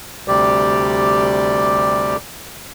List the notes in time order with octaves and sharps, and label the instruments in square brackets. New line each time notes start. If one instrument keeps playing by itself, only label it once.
[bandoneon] D2 C3 G3 G4 D5